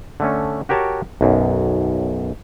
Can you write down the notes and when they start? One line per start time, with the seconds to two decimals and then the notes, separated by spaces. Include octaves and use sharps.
0.20 D3 A3 C#4
0.69 F#4 G4 A#4 C#5 G5 A5
1.21 B1 F#2